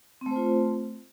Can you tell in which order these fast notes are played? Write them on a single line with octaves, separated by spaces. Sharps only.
C4 A3 C5 F4